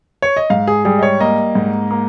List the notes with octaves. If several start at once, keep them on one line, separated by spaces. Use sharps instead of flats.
C#5
D#5
G#2 F5
G#4
G3 G#4
D#5
C#5
A#3 D#5
G#2
A#3